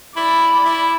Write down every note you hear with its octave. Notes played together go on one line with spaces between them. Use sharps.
E4 D5 B5
E4